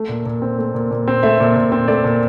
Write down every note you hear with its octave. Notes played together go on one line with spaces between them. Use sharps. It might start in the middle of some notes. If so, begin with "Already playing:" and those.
Already playing: A3
A#2
A#2
C4
A3
A#2
A#2
C4
A3 E5
A#2
A#2
C4
A3 D5
A#2